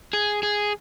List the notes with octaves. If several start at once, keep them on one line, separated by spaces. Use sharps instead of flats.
G#4
G#4